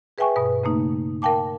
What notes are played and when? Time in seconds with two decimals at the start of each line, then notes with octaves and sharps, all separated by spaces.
0.18 G#4 B4 E5 G5 G#5 C#6
0.36 G2 B2 B4
0.64 C#3 A3 A#3 D#4
1.22 A#4 F5 G5 A5 D6